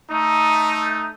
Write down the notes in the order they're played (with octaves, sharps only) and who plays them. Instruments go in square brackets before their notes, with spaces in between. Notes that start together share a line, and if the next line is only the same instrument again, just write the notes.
[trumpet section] A3 D#4